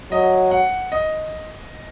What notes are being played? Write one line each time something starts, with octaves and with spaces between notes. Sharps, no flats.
F#3 D#5
F#5
D#5